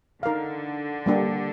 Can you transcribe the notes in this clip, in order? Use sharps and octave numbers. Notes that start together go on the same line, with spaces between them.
D3 D#4 A#4 F5
G3 A#3 D4 G4